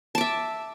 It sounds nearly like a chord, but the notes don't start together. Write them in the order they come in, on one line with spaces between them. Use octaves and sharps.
A5 D6 E5